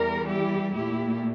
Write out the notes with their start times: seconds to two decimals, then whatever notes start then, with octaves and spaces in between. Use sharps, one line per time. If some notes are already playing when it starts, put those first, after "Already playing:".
Already playing: E2 E3 G3 A#4
0.27 E4 G4
0.73 A#2 A3 E4 G4